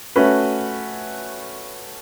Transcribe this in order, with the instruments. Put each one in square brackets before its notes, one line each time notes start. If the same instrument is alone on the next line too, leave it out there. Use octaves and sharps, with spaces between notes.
[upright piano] A3 C#4 F#4 B4